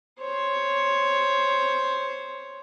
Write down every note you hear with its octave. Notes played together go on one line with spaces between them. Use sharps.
C5 C#5